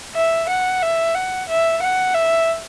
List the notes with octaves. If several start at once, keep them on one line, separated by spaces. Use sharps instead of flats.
E5
F#5
E5
F#5
E5
F#5
E5